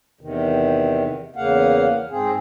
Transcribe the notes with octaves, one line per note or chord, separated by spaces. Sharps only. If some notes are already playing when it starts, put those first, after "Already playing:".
E2 C3 D#3
E2 C#3 A#3 F5 F#5
G#2 C4 G#4